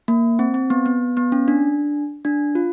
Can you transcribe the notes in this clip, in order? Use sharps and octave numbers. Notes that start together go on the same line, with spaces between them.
A#3
C4
C4
B3
B3
B3
C#4
D4
D4
F4